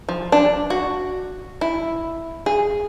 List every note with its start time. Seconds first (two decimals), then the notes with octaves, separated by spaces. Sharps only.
0.09 F3
0.32 D4
0.70 F#4
1.61 E4
2.46 G#4